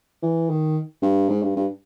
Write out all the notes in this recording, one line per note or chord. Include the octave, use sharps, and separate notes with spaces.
E3
D#3
G2
G#2
G2
G2